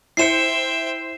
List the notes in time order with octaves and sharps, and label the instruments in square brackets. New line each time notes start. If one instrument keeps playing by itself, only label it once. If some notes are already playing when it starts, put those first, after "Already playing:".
[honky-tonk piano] E4 C5 C#7 [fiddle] E5 G5 [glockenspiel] C7 E7